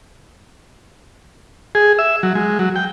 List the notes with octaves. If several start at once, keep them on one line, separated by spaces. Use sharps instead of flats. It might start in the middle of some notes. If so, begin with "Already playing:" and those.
G#4
E5
F#3
G#3
F#3
G5